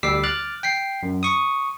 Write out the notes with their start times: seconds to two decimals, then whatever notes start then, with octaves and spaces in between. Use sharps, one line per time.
0.03 D2 G3 D6 E6 B6 C7
0.23 D6 F6 F#6 A6
0.63 G5 B6 C7
1.03 F#2
1.23 C#6 D#6